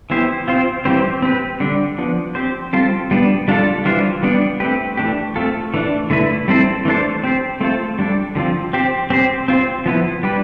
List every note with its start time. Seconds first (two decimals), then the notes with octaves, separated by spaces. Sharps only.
0.10 E3 B3 E4 G4 C5
0.48 C4 F4 C5
0.85 E3 G3 C4 G4 C5
1.23 C4 G4 B4
1.60 D3 G3 D4
1.98 F3 B3 D4
2.35 C4 G4 C5
2.73 G3 C4 F4 A4 C5
3.11 G3 B3 D4
3.48 G3 D4 F4 A4
3.85 E3 G3 D4 F4 C5
4.23 G3 B3 D4
4.60 A3 C4 G4 B4
4.97 E3 A3 D4 G4
5.36 A3 C4 F4 A4
5.74 E3 A3 D4
6.10 D3 A3 E4 B4
6.48 G3 C4 E4 A4 C5
6.85 E3 A3 D4 A4 C5
7.24 C4 G4 C5
7.61 A3 C4 F4 A4 C5
7.99 G3 D4 A4
8.35 D3 F3 C4 F4
8.73 C4 G4 C5
9.10 C4 G4 C5
9.48 C4 F4 C5
9.86 F3 B3 E4 B4
10.23 G3 D4 G4 B4